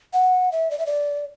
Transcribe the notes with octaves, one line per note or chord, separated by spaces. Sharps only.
F#5
E5
D5
E5
D5